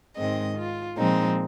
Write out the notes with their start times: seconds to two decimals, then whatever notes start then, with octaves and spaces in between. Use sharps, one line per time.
0.17 G#2 D#3 G#3 C4 D#5
0.57 F4
0.97 A#2 F3 G#3 C4 D#4